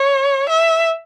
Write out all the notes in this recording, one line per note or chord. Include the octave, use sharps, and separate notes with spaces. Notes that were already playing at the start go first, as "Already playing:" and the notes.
Already playing: C#5
E5